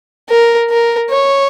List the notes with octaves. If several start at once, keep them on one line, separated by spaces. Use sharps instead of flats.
A#4
A#4
C#5